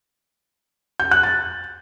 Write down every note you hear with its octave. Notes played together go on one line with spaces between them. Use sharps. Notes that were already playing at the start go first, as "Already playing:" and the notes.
G6
F#6
A6